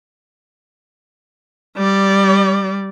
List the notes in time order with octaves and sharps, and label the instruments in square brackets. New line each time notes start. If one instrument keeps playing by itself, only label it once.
[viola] G3 D5